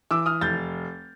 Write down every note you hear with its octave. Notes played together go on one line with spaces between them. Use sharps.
E3 D6 E6
D#6 F6
F1 G6 A6